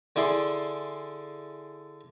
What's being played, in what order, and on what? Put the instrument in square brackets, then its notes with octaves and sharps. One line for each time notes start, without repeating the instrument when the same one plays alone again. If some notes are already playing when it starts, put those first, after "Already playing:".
[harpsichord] D3 E4 G#4 D5 C6